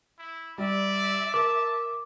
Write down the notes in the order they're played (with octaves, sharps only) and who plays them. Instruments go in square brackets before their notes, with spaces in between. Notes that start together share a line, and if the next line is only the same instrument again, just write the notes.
[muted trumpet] E4
[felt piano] G3 [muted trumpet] D5 [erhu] E5
[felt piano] A#4 [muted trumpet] A5 [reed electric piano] D6